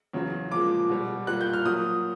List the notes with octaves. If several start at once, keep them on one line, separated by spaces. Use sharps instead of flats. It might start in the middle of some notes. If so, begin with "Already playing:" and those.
E2 C#3 F#3
A#2 F3 G#3 D6
B2 G3
A#2 G3 F#6
G6
F6
A#2 F#3 D#6